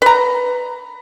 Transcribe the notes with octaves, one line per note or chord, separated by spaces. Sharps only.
B4 A#5